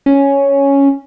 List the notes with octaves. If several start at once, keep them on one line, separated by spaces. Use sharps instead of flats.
C#4